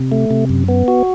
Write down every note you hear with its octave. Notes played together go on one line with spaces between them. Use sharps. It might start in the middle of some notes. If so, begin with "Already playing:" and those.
Already playing: C3
A3
C3
F#2
B3
F#4